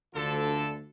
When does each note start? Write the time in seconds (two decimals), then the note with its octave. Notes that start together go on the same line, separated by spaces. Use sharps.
0.14 D2 D3 F4 A4